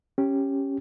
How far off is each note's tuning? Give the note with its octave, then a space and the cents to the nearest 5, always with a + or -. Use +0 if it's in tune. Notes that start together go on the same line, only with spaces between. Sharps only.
C#4 -10 G4 +0